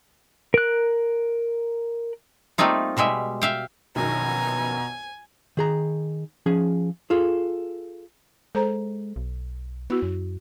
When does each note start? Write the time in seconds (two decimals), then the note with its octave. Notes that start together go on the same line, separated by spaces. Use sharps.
0.54 A#4 F#6
2.58 G3 A3 A#3 C4 D#4 F4
2.97 B2 G3 G#3 E5
3.42 E5 F5 G5
3.96 A#1 F#2 B2 D#3 G#5 A#5
5.57 D#3 G#4 A#5
6.46 F3 C#4 G#4
7.10 F4 G#4 A4
8.55 G#3 A4 C5 A#5
9.16 B1
9.90 B3 E4 F#4
10.02 F#2